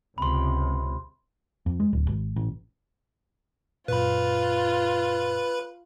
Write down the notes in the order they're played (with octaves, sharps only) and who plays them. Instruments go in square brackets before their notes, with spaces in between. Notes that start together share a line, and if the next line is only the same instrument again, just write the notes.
[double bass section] C#2 C3 [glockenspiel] B5 C6
[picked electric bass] F2
G#3
D1
G#1
A1
[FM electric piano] F#2 A#2 [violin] F4 [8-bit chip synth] B4 B5